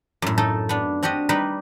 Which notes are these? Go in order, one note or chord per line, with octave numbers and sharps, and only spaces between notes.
F#2 A2
A3 D#4 A4
B3 D4
C4 D4 F#4 G4 D#5
G3 D#4 B4